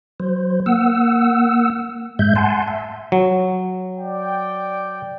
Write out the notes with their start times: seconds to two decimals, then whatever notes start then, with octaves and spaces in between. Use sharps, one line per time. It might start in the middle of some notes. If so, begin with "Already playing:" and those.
0.20 F#3 C5
0.66 A#3 F#5 E6
2.19 G#2 G#3 E5 G6
2.36 F#5 G#5 A5 C6
2.68 E5
3.12 F#3
3.98 D5 G5